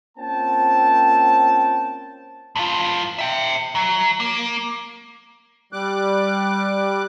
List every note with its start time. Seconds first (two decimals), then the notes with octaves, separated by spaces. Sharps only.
0.18 A#3 C4 C#4 F4 G5 A5
2.56 G2 F4
3.19 E5 G5
3.75 F#3
4.20 A#3
5.73 G3 D6 F#6